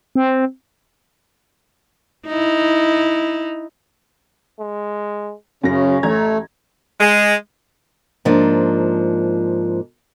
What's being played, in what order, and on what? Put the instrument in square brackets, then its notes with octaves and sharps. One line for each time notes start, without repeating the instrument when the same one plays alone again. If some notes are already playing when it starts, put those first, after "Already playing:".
[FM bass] C4
[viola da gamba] D#4 E4
[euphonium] G#3
[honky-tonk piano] F#2 A#6 [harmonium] C#3 [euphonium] C#4
[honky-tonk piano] A1 A#5 G#6 [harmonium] A3
[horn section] G#3
[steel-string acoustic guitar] G#2 F3 A#3 D4